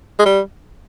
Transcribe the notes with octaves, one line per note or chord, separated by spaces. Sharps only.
G#3
G3